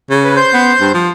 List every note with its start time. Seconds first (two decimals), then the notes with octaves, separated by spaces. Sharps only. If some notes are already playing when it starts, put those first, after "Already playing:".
0.10 C#3
0.24 B4
0.36 C5 C6 G6
0.53 B3
0.80 G2
0.94 F3